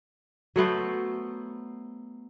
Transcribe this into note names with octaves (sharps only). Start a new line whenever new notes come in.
F#3 A3 B3 C5